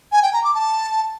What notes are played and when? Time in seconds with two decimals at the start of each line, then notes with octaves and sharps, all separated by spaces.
0.12 G#5
0.23 G5
0.33 A#5
0.44 D6
0.54 A5